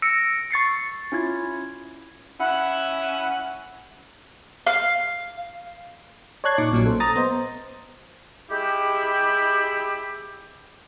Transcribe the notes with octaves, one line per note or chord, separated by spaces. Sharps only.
E6 A#6 C#7 D7
C#6 A6 C7 C#7
C#4 E4 F4 G#6
C#4 E4 F#5
F5
C#5 D5 A5 F#6 G#6 C7
A#2 D#4 C#6 D6
A#1 A#2 F#3 C#4
A4 C5
A#5 D#6 A6
B3 C5 D#5
G#3 E4 G4